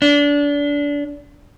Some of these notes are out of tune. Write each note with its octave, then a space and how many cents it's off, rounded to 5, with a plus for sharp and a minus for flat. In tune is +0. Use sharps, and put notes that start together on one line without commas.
D4 -25